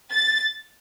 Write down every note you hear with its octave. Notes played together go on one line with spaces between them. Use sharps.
A6